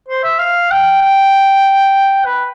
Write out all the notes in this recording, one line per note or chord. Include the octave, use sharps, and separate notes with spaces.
C5
E5
F5
G5
G5
B4